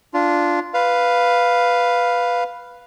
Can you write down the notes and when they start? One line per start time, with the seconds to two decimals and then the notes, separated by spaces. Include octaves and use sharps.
0.14 D4 F4
0.74 B4 F5